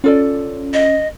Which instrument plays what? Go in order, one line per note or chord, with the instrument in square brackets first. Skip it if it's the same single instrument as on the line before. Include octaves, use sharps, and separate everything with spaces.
[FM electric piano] C#4 [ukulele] F4 A4 D5
[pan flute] D#5